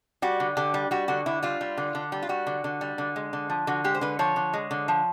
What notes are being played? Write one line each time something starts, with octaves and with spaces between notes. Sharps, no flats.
G3 F#4
D3
D3 G4
G3
G3 F#4
D3 F#4
D3 E4
G3 F4
G3
D3
D3
G3
F4
G3 F#4
D3
D3
G3
D3
G#3
D3
F3
D3 F#4
G#3 G4
C5
D3 B4
F3 C#5
D3
G#3
D3
F3